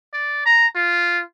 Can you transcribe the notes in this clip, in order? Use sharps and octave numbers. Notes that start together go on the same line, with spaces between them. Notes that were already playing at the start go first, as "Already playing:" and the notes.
D5
A#5
F4